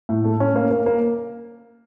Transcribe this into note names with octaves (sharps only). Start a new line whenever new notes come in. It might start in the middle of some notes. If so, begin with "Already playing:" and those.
A2
A3
C#4
A#3
A#3
A#3